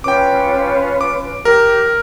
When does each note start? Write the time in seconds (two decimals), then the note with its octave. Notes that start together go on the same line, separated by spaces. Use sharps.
0.04 C#4 F4 B4 G5 D6
1.01 D6
1.45 G4 A#4